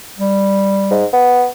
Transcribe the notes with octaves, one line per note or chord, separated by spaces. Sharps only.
G3
G#2
B3